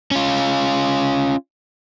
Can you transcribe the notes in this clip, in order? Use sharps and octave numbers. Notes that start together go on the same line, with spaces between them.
C#4 F4